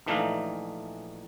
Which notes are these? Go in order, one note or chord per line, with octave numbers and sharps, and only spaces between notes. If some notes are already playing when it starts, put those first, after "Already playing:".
A#1 E3 A3 D4 D#4 F5